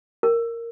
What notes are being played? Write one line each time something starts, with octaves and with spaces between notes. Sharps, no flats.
A#4